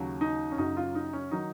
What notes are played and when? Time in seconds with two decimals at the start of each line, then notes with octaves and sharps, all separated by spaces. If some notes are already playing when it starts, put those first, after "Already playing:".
Already playing: D#2 C#3 F#3
0.21 D#4
0.52 C#4
0.58 F#2 C#3 F#3 D#4
0.77 F4
0.95 D#4
1.13 C#4
1.31 D#3 F#3 D#4